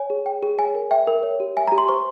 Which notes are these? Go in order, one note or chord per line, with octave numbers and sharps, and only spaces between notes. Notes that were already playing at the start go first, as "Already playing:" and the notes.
Already playing: C#5 G#5
G#4
G5
G#4
C#5 G#5
A#4
E5 G5
A#4
C#5
G4
E5 G#5
G4 A#5
C6
C5 C#6